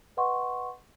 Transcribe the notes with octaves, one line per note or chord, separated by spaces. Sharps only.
B4 D#5 F#5 C6 C#6